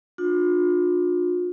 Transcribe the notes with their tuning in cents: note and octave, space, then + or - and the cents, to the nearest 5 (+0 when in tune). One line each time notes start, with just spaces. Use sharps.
D4 +25 F4 +40